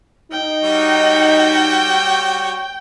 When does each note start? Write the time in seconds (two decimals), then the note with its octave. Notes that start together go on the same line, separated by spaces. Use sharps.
0.32 D#4 G5
0.63 G3 F#4 C#5